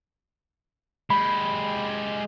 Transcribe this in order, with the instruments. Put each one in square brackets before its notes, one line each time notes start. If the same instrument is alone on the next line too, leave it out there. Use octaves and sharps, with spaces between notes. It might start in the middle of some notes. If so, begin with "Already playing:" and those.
[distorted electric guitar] G#3 G4 [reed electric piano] B5